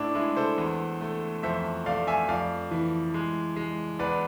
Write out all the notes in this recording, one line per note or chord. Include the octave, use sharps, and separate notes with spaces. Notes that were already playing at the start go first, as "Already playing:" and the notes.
Already playing: A2 D4 E4
G#3 E4
A4 C5
E2
A3
F2 C5 E5
A3 D5 F5
E5 G#5
F2 D5 F5
E3
G#3
G#3
E2 B4 D5